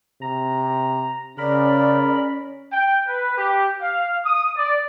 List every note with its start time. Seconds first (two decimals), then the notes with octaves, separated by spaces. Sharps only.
0.22 C3 A#5
1.38 C#3 C#4 A#4 D5 B5
2.72 G5
3.07 B4
3.37 G4
3.81 F5
4.24 D#6
4.56 D5